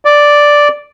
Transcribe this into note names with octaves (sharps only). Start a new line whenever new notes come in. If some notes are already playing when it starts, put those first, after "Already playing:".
D5